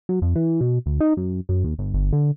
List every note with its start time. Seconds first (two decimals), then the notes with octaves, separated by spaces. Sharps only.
0.09 F#3
0.22 F2
0.35 E3
0.61 B2
0.86 D2
1.00 D#4
1.17 F#2
1.49 F#2
1.64 D#2
1.79 G1
1.94 G1
2.13 D3